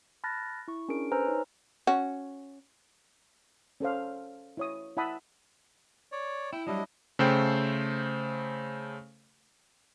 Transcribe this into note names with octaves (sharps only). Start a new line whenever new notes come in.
A5 B5 F6 F#6 A6 A#6
E4 C#6
C#4 D4 G#4 A#4 D7
B4 C5 G#5 A#5 E6 F6
D#4 C#5
C#4 F#4
C#4 A4 C5 F5
E4 C#5 D#6
E4 E5 F#5 A5 B5 D#6
C#5 D5
E4 G5
F#3 G3 D4 E4 D#5
C#3 A3 A4 C5 G5